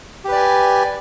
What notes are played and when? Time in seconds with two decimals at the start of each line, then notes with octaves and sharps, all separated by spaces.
0.24 G4
0.28 B4
0.32 D5
0.36 G#5